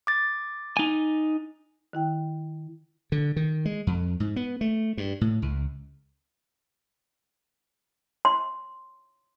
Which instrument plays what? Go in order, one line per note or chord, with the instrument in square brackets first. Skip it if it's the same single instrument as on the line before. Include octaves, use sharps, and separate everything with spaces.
[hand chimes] D6 A6
[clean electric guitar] D#4 G#5
[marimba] D#3 E4 G5
[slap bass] D3
D#3
G#3
F2
G#2
B3
A3
G2
A2
C#2
[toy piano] C6